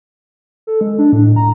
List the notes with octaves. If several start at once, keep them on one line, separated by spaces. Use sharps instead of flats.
A4
G#3
D4
A2
A#5